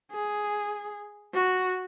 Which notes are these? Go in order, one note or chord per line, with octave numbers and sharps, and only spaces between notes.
G#4
F#4